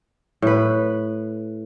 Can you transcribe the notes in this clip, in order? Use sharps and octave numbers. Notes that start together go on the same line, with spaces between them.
A2 B4